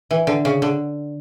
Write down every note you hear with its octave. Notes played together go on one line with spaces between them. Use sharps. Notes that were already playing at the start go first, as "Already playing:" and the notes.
E3
D3
C#3
D3